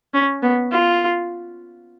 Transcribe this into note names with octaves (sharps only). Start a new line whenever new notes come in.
C#4
B3
F4